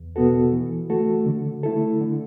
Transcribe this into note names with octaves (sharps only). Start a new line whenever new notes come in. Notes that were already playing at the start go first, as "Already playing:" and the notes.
Already playing: E2
B2 B3 F#4 A4
E3
A3 F#4 A4
D3
A3 E4 A4
D3